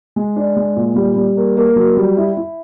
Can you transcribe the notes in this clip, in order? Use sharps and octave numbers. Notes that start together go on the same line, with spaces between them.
G#3
D4
G#3
A#2
G3
G3
A#3
A#3
F#3
G3
E4
E4